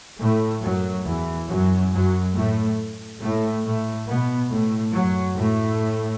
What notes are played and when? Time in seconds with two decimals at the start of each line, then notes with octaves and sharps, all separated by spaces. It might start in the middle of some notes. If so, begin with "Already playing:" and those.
0.18 A2 A3
0.62 F#2 F#3
1.05 E2 E3
1.48 F#2 F#3
1.91 F#2 F#3
2.34 A2 A3
3.20 A2 A3
3.64 A2 A3
4.07 B2 B3
4.50 A2 A3
4.93 F#2 F#3
5.36 A2 A3